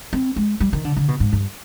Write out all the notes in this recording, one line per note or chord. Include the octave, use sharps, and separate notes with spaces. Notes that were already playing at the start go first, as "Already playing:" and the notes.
C4
G#3
G3
D#3
D3
D3
B2
G#2
G2